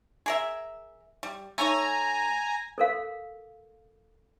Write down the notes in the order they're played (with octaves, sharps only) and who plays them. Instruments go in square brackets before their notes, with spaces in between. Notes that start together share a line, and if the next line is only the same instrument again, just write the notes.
[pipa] G#4 A#4 E5
G3
[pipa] A3 D#4 C#5 [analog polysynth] G#5 A#5
[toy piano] A4 A#4 F5